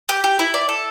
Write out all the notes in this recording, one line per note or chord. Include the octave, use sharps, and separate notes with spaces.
G4
G4
E4
D5
A4